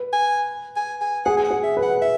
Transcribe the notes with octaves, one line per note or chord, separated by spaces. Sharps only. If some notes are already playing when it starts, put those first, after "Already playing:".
Already playing: B4
G#5
G#5
G#5
G#4 F#5
G#5
F#5
G#4
E5
B4
F#5
E5